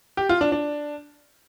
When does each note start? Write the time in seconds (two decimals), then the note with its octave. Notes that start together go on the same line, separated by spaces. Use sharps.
0.17 G4
0.29 F4
0.41 D4
0.52 D4